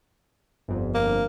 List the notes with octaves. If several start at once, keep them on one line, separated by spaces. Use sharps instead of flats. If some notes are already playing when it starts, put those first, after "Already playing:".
G1 F2
A#3